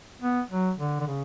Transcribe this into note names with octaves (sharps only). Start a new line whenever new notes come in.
B3
F#3
D3
D3
C#3